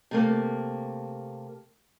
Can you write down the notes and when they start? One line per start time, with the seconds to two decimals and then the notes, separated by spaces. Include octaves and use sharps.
0.11 C3 A3 A#3